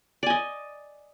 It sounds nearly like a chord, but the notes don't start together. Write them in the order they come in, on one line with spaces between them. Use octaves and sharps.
D5 G#5 D#5